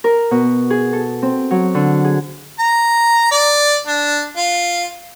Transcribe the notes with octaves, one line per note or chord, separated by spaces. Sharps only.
A#4
B2
G#4
A4
C4
F#3
D3
G#4
A#5
D5
D4
F4